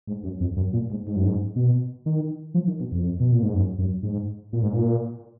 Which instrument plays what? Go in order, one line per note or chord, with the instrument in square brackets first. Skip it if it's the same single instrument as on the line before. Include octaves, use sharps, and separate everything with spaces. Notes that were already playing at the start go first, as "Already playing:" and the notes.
[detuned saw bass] G#2
F#2
F2
F#2
A#2
G#2
G#2
F#2
G#2
B2
D#3
F3
D#3
B2
F2
B2
A#2
G#2
F#2
F#2
G#2
A#2
G#2
A#2